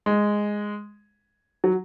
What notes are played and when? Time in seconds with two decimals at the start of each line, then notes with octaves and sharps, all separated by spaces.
0.06 G#3
1.64 F#3